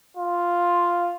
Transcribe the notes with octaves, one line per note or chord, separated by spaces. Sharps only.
F4